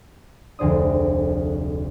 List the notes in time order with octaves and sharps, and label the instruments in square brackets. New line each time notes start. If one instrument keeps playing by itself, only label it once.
[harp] F1 D2 G#4 C5 D5 D#6